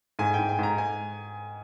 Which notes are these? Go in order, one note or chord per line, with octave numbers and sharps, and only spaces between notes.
G#2 G#5
G5
G#2
G#5
G#2 A#5
G#5